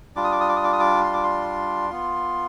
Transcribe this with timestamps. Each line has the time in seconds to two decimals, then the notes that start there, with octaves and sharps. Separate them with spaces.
0.16 G3 D4 F4 D6
0.24 D#6
0.32 D6
0.40 D#6
0.49 D6
0.56 D#6
0.64 D6
0.73 D#6
0.80 D6
1.04 C6
1.14 D6
1.23 C6
1.90 B3 F4